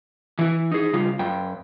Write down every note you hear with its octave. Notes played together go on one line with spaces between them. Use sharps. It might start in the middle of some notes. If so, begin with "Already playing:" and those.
E3 E4
D#4 G#4
C#3 G3 F4
F#2 G5